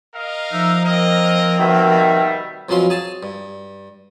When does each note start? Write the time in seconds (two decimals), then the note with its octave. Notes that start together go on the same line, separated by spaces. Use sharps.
0.14 A#4 D#5 F5
0.53 F3 D#4 E5
0.84 A#3 C4 A#4 D#5
1.59 B2 D#3 G3 E5
2.69 F2 B2 F#3 C#4 F5 C6
2.90 G#4 G#5 A5
3.23 G2